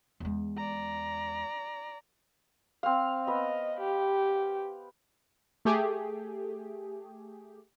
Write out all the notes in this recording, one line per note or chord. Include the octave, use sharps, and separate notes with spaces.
E2 G#3
D5 A#5
C4 F5
B3 B4 D#5
G4
A3 G4 G#4